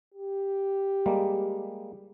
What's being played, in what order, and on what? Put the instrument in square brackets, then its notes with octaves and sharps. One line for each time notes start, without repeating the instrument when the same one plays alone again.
[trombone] G4
[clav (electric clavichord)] G3 G#3 A#3